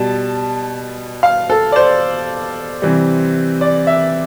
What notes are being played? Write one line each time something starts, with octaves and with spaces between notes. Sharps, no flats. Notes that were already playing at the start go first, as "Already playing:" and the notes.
Already playing: B2 G3 A5
F5
A4
D5
C5
C3 E3 G3
D5
E5